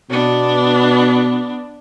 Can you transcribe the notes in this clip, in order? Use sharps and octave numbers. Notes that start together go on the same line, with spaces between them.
B2 B3 D4